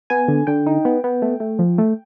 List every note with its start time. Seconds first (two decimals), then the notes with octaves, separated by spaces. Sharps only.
0.10 B3 G#5
0.28 D3
0.47 D3 G5
0.67 D#4
0.85 B3
1.04 B3
1.22 A3
1.40 A3
1.59 F3
1.78 A3